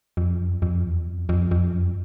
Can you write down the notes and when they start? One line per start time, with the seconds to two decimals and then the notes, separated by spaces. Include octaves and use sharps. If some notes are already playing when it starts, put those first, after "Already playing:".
0.17 F2
0.40 F#2
0.62 F2
0.84 E2
1.07 F2
1.29 F2
1.51 F2
1.73 F#2